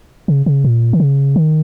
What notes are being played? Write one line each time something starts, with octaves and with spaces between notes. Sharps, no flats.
C#3
C#3
A#2
D#3
C#3
D#3